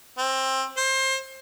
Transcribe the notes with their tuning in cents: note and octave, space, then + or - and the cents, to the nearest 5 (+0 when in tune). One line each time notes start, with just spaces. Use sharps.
C4 +20
C5 +25